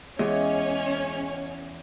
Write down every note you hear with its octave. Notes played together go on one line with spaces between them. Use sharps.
E2 G#3 C#4 C#5 D#5